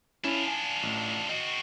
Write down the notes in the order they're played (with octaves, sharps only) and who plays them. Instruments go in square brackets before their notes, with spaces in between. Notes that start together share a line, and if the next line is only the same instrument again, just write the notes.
[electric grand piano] C#4 E4 E7 [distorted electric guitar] D4 F4
[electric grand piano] G#5
A1
[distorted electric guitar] C4 F#4 [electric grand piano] D#5